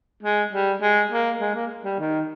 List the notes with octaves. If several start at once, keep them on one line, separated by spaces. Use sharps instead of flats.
G#3
G3
G#3
A#3
G#3
A#3
G3
D#3